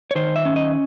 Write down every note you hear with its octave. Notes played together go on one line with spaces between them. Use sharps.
C#5
D#3 C5
E5
C#4
D#5